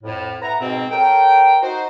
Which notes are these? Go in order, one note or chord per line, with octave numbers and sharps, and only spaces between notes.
F2 A2
B4 E5 F#5 A#5
G#2 B2 C4
A4 A#4 C#5 G5
D#4 F#4 C5